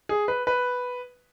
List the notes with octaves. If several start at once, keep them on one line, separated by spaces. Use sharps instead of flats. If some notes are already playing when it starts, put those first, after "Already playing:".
G#4
B4
B4